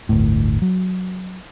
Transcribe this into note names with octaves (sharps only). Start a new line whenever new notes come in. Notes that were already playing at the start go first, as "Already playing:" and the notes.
G1 D2 A2
F#3